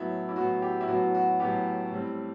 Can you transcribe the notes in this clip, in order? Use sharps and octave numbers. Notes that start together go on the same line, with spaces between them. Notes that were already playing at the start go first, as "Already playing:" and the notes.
Already playing: A2 F#3 B3 E4
E4
A2 F#3 B3 F#4
G4
E4
A2 F#3 B3 F#4
F#4
A2 F#3 B3 G4
A2 G3 C4